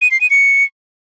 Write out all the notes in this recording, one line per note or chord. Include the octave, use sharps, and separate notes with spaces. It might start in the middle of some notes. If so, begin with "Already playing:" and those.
D#7
C7
D#7
C#7